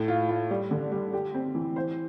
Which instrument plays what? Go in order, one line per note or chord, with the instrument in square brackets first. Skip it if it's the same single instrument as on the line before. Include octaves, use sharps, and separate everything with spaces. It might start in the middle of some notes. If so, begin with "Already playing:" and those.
Already playing: [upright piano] A2
F4
F4
G3
D3
G3
G4
C4
E3
C5